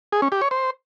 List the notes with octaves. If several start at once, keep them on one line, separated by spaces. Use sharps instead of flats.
G#4
C#4
G4
C#5
C5